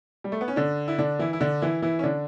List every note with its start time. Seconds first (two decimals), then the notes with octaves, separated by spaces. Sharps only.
0.24 G3
0.32 A3
0.41 B3
0.48 C#4
0.56 D3 D4
0.88 E4
0.98 D3 D4
1.19 E3 E4
1.33 E4
1.41 D3 D4
1.62 E3 E4
1.82 E3 E4
1.99 C#4
2.03 D3 D4